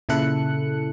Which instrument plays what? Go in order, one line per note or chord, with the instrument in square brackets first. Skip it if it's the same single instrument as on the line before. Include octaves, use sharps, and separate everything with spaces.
[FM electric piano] A#2 C#3 E4 A4 F#6 C#7